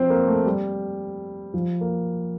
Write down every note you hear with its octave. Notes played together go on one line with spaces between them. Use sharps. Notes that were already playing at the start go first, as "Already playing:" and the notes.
Already playing: F3 C4
A#3
A3
G3
F3
A#3